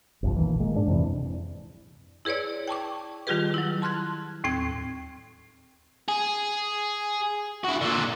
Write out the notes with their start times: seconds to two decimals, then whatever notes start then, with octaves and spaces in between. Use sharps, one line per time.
0.23 G1 C2 F2
0.36 A#2 D#3 E3
0.59 A#2 G#3 A#3
0.75 G#2 D4
0.87 F2 C3 E3
2.25 E4 G#4 B4 C#5 D5
2.68 G5 A5 C#6 D6
3.27 D#3 G3 F4 G4 G#4 B4
3.54 F#3 E4
3.82 A5 C6 F6 F#6 G#6
4.44 D#2 A2 C4 G5 G#6
6.08 G#4
7.65 E4 F#4
7.82 A#2 D3